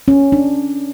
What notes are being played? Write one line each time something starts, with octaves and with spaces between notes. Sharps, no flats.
C#4
D4